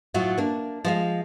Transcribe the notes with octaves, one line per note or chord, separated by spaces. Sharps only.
A2 F#3 F4 F#4
A#3 D4
F3 G#3 F5